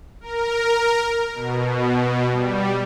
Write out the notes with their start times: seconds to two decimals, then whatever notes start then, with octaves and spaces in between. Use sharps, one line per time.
0.21 A#4
1.34 B2
2.31 G3